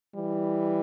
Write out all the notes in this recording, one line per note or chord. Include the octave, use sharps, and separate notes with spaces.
E3 G3